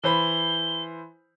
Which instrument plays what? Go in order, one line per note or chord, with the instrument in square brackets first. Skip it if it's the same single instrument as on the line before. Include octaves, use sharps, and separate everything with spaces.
[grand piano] E3 C5 B5 [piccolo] G7